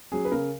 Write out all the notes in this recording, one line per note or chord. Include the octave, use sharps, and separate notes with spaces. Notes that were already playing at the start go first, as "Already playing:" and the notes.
F#3 C#4 G#4
B4
C#3 A#4